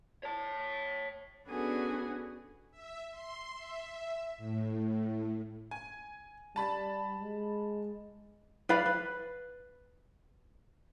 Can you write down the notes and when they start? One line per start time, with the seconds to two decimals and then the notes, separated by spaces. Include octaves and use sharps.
0.23 C#5 A5
1.48 B3 C#4 D4 F#4 G#4 A4
2.71 E5
3.11 C6
3.53 E5
4.37 A2
5.71 G#5
6.56 G3 A5 B5 A6
7.20 G#3
8.69 B4 D5 F5 B5
8.86 B4